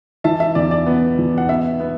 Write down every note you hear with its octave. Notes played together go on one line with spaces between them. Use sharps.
E3 E5 A5
E5
E2 D5
D5
B3
E2
F#5
B3 E5
B3